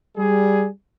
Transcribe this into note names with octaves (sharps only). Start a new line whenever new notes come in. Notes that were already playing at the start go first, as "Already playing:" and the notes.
G3 G#4